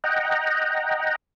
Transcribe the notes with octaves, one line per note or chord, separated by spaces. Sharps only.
D#5 F#5 G5 A#5